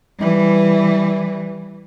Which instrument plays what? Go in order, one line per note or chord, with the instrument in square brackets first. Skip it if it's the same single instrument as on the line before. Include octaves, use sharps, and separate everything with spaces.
[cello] E3 G3